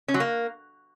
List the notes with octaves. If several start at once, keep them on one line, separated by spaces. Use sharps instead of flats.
C#4
F#3
A#3